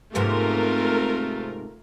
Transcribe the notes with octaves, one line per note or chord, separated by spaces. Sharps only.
G#2 C3 A3 B3 F4 A#4